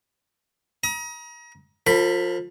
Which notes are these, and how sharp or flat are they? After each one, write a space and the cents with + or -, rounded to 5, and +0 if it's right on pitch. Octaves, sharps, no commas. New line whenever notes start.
A#5 +35 D#6 +35
F3 +25 A#4 -40 B5 +0